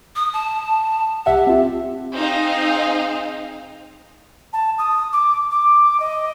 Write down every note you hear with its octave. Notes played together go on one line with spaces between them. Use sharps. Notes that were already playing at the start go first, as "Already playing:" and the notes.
D#6
A5
C2 G4 E5 F#5
C4 F4
C4 D#4 G#4 D#5 F5
A5
D#6
D6
D6
D#5